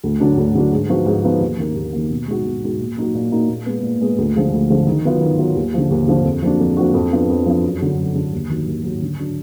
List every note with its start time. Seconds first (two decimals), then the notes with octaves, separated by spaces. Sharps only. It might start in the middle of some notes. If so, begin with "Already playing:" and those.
0.03 D2
0.20 D3 F#3 D4
0.37 D2
0.55 D3 F#3 D4
0.72 G#2
0.89 F3 B3 D#4 F#4
1.06 G#2
1.24 F3 B3 D#4 F#4
1.41 D#2
1.58 D#3 A#3
1.75 D#2
1.93 D#3 A#3
2.10 B2
2.28 G#3 D#4 F#4
2.45 B2
2.62 G#3 D#4 F#4
2.79 A#2
2.97 F#3 A#3 D#4 F#4
3.15 A#2
3.32 F#3 A#3 D#4 F#4
3.49 A#2
3.66 G#3 B3
3.83 A#2
4.01 G#3 B3
4.18 D2
4.35 D3 F3 G#3
4.52 D2
4.69 D3 F3 G#3
4.87 D#3
5.05 F#3 B3 F4
5.21 D#3
5.38 F#3 B3 F4
5.56 D#2
5.74 D3 F3
5.90 D#2
6.08 D3 F3
6.25 F2
6.42 F3 A#3 D4 F#4
6.60 F2
6.77 F3 A#3 D4 F#4
6.94 F2
7.12 F3 B3 D4 F4
7.29 F2
7.46 F3 B3 D4 F4
7.64 F#2
7.81 D3 F#3
7.98 F#2
8.15 D3 F#3
8.33 D#2
8.50 D#3 F#3
8.67 D#2
8.84 D#3 F#3
9.02 D3
9.19 F#3 D4